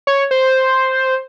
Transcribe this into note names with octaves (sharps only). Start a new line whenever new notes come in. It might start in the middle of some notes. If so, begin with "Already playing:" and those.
C#5
C5